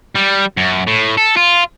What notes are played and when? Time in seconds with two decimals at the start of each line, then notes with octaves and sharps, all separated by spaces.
0.15 G3
0.57 F#2
0.87 A2
1.18 A4
1.37 F4